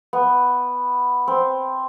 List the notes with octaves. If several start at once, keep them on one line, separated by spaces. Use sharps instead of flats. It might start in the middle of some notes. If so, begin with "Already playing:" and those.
B3
C4